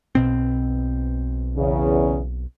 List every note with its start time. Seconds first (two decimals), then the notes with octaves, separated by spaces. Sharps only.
0.15 B1 B2 C4
1.56 E2 C#3